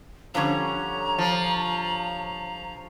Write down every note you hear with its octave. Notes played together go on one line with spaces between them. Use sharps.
D3 F3 G3 C#4 C#5 A#5
F3 A5